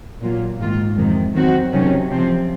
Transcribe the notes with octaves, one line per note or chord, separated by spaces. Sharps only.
A#2 F#3 A#3 F4
G#2 D#3 A#3 F4
F2 C3 D#3 G#3
D#3 F#3 C4 F#4
C3 D#3 F#3 C#4
C3 F3 C4